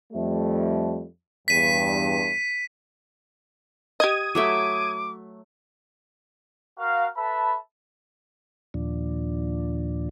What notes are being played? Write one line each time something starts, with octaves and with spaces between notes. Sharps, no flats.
F2 G3 A3
E2 G2 B6 D#7
G4 D#5 D#6 G#6 D#7
F#3 A3 E5 D6
F#4 A#4 F5
A4 B4 E5 A5 B5
D#2 A#2 F3 D4